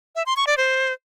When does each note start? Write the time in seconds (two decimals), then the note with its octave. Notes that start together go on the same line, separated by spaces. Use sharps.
0.16 E5
0.26 C6
0.37 C#6
0.47 D5
0.58 C5